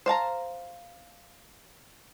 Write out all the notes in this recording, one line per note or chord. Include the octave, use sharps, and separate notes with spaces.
C5 F5 A5 A#5